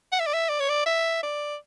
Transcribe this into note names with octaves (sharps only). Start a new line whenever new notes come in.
F#5
E5
D5
E5
D5
C#5
D5
E5
D5